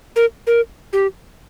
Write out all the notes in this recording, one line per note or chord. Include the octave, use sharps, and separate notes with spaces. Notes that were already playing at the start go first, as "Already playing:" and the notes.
A#4
A#4
G4